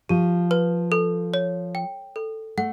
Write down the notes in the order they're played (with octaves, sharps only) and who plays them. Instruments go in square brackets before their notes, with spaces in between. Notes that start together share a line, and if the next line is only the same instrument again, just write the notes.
[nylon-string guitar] F3 [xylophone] G4
[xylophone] B4
A4
C#5
G5
A4
[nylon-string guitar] A3 [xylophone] F#5